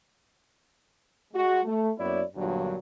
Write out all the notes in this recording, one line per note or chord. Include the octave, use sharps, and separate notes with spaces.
G#3 F#4
A3
F#2 A#3 B3 E4 C#5 D5
G1 G2 A#2 F#3